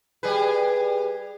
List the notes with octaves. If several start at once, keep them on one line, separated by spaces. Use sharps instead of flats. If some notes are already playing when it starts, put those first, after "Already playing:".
G3 G#4 B4